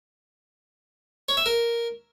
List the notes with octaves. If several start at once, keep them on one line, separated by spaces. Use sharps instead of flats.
C#5
E5
A#4